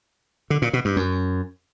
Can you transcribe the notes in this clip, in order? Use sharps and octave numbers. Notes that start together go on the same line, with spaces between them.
D3
A#2
B2
G2
F#2